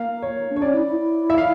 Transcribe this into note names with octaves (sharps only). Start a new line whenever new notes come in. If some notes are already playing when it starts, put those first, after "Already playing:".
Already playing: A#3 F5
C#5
D4
C#5
C#4 D5
E4
E4
E5
F5